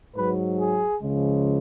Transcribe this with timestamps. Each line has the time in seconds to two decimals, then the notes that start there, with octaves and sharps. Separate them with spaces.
0.16 G#2 F#3 B4
0.58 G#4
1.01 C#2 C#3 F3 G#3